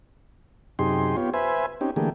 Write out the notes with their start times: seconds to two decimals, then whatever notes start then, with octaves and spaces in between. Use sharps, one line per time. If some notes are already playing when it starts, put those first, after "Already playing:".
0.79 F#2 C3 D#4 G4 G#4 C6
1.17 B3 F4 G4 C#5
1.34 B4 C5 E5 G#5
1.81 C4 C#4 D#4 G4
1.96 D3 E3 A3 A#3 G4 G#4